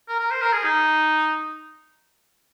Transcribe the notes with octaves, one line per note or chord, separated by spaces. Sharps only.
A#4
A#4
C5
A#4
G#4
D#4